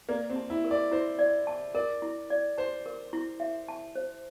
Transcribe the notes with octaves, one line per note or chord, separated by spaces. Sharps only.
A#3 D5
C4
A5
E4
A#4
D5
E4 C5
D5
A5
A#4 D5
E4
D5
C5 A5
A#4
E4
E5
A5
C5